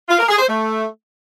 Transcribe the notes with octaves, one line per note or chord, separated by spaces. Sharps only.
F4
A#4
G#4
C5
A3